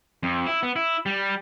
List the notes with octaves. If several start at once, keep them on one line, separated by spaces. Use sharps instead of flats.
F2
E4
B3
E4
G3